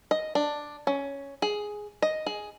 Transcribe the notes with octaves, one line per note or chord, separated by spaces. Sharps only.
D#5
D4
C#4
G#4
D#5
G#4